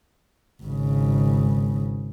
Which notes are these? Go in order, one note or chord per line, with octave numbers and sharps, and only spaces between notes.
G#1 C#3